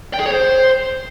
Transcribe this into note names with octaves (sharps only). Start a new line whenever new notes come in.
G5
G#4
C#5
C5